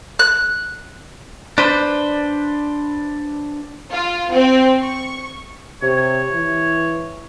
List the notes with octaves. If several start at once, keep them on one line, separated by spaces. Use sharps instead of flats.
F#6
D4 B4 C5
F4
C4
C#6
C3 C#5
E3